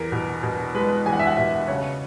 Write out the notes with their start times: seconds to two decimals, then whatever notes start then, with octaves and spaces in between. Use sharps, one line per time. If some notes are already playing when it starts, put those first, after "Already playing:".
Already playing: E2 A#4
0.12 B2
0.43 B2
0.74 G#3 B4
1.06 E2 G#5
1.13 F#5
1.19 E5
1.27 F#5
1.37 B2 E5
1.68 C#3 C#5